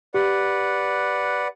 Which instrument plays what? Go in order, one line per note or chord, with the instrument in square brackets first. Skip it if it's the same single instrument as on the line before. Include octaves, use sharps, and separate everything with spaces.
[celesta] G4 [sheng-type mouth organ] B4 D5 F#5